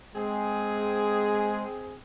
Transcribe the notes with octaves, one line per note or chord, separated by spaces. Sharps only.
G#3 C4 G#4